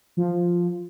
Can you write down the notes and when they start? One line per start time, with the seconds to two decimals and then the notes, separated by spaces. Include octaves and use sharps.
0.17 F3